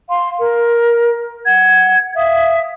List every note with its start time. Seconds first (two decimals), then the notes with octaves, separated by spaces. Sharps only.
0.09 F5 C6
0.40 A#4
1.46 F#5 G#6
2.16 E5 F5 D#6